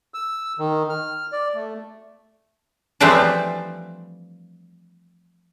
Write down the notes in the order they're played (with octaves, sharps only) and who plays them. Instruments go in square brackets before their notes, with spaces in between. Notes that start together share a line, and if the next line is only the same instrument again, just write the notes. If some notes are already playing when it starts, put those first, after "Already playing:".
[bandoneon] E6
D#3
F6
D5
A3
[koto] E3 F3 G3 A3 C4 D4